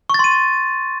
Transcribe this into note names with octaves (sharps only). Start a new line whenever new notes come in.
C6 C#6 A6 D#7